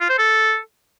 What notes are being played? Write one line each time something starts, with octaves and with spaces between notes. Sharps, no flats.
F4
C5
A4